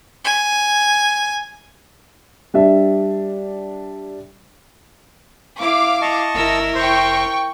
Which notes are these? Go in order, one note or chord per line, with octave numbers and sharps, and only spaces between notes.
G#5
G3 D4 E5
E4 F5 D6
D#5 A5 C#6
G1 E4 A#4 E6
F1 C5 G5 C6 C#6